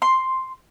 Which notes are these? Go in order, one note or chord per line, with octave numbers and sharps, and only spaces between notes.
C6